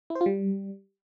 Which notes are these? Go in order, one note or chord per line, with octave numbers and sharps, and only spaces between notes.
E4
C5
F4
G3